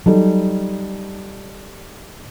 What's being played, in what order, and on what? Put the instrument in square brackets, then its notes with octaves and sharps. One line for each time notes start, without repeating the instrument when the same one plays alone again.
[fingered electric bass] F#3 [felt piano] G3 D#4 A4